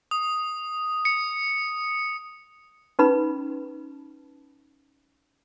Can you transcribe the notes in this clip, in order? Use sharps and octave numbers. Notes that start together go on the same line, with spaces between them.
D#6
C#7
C#4 D#4 B4 B5